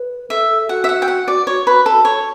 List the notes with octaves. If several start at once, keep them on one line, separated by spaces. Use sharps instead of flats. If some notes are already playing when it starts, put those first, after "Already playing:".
Already playing: B4
A4 E5
F#4 F#5
E5
F#5
G5
F#5
D5
C#5
B4
A4
C#5